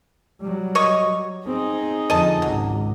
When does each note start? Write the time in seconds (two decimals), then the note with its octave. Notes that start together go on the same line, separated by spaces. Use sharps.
0.41 F#3 G3
0.75 C#5 D#5 C#6
1.46 C4 D#4 G#4
2.10 F2 D3 D#5 A5
2.42 G#1 C#2 F#3